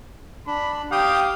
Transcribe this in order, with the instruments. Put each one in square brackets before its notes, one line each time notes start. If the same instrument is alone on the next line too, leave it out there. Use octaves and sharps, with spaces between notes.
[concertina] D4 [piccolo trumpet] B5
[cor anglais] G4 [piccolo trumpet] F5 [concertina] G5 D#6